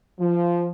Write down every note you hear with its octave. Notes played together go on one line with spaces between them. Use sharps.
F3